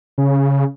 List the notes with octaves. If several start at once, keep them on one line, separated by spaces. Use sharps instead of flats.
C#3